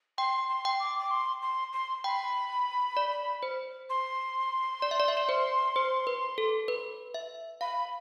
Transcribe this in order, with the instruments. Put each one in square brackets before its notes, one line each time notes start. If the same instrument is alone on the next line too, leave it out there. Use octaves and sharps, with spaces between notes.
[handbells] G5 [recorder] C6
[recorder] C6
[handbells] G5
[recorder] D6
D6
C6
C6
C6
[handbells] G5 [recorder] B5
[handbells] D5
C5
[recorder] C6
[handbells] D5
E5
D5
E5
D5
C5
C5
B4
A4
B4
E5
[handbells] F5 [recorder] B5